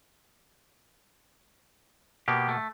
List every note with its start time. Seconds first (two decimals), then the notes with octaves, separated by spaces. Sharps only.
2.28 B2 A#3 B3 G4
2.49 A3